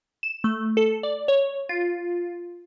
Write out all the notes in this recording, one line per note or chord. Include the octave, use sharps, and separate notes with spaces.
E7
A3
A4
D5
C#5
F4